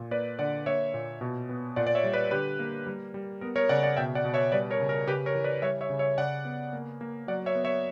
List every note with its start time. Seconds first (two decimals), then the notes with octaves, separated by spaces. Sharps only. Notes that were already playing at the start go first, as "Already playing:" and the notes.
Already playing: A#2
0.11 A#3 B4 D5
0.39 D3 D5 F#5
0.66 A#3 C#5 E5
0.94 A#2
1.21 B2
1.49 B3
1.76 A#2 D5 F#5
1.87 D5
1.95 C#5 E5
2.04 G3
2.13 B4 D5
2.31 D3 G4 B4
2.59 A#3
2.87 G3
3.14 G3
3.41 B3 A#4
3.56 A#4 C#5
3.69 C#3 D5 F#5
3.83 D5 F#5
3.97 B2 E5 G5
4.15 D5 F#5
4.25 B2
4.34 C#5 E5
4.52 G3 B4 D5
4.70 A#4 C#5
4.80 C#3
4.89 A#4
5.07 C#3 G4 B4
5.26 A#4 C#5
5.35 E3
5.44 B4 D5
5.62 G3 C#5 E5
5.81 C#5 E5
5.90 C#3
5.99 C#5 E5
6.18 C#3 D5 F#5
6.45 B3
6.73 A#3
7.01 A#3
7.27 F#3 D5 F#5
7.46 C#5 E5
7.55 B3
7.64 C#5 E5